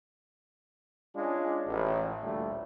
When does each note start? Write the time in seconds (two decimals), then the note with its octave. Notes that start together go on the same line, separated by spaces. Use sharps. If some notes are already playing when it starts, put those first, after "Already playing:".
1.15 G#3 C#4 D4 F4
1.67 A1
2.22 D2 A#2 G3 A3